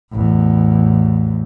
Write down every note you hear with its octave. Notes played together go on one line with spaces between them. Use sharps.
A1 E2